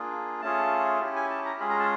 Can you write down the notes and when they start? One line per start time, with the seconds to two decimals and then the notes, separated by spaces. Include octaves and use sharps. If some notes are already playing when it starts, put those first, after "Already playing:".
Already playing: A#3 D4 F4 G#4
0.42 A3 C#4 F4 G#4 A5
1.01 C#4 E4 G4
1.16 G#5
1.30 A5
1.45 A#5
1.60 G#3 C#4 F4 G#4 B5
1.70 A#5
1.80 A5